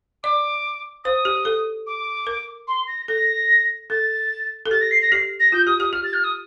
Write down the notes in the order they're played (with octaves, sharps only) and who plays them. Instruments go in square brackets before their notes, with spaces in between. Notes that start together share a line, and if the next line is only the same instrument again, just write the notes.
[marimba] D5 [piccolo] D6
[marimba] C5 [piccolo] D#6
[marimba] G4
A4
[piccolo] D6
[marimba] A#4
[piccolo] C6
A#6
[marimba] A4 [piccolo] A#6
[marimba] A4 [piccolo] A6
[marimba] A4
[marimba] G4 [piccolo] A6
[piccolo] A#6
C7
A#6
[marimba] G4 [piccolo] C7
[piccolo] A#6
[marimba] F4 [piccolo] G6
[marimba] G4 [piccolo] D#6
[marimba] G4 [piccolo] D#6
[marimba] G4 [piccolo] F6
[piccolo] A6
F6
D#6